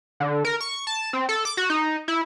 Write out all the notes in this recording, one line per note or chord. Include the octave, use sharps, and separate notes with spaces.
D3
A#4
C#6
A5
C4
A4
D6
F#4
D#4
E4